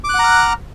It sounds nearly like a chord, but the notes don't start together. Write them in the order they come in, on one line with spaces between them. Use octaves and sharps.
D6 F#6 F#5 A#5 F6